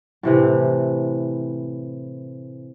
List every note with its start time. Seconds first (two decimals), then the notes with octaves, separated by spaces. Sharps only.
0.23 A2 C3 E3